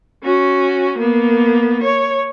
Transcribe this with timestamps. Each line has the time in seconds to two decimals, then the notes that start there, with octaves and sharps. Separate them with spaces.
0.24 C#4 F#4
0.99 A#3 B3
1.84 C#5